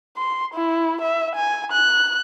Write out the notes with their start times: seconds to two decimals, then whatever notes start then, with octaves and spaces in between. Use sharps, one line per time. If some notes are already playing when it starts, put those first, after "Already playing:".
0.17 C6
0.54 E4
1.01 E5
1.35 G#5
1.72 F#6